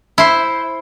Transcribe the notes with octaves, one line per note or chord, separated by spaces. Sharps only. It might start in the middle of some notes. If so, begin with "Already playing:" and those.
E4 C5